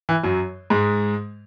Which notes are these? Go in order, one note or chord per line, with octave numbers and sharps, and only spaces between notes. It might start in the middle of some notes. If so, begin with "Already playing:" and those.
E3
F#2 F#3
G#2 G#3